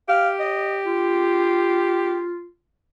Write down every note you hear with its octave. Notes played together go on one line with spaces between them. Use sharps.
G4 F5
D#5
F4